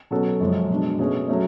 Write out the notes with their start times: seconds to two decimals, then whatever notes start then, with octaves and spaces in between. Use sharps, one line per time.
0.11 B2 F#3 C#4 F#4 A4
0.40 F#2 C#3 F3 G#3 C#4
0.69 B2 G#3 D4
0.99 B2 A3 C#4 G#4
1.28 F#3 A3 C#4